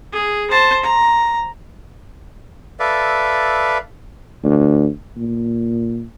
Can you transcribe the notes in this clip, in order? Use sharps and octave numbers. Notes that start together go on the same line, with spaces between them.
G#4
C5 A5
A#5
A4 B4 D5 E5 F5
D2
A#2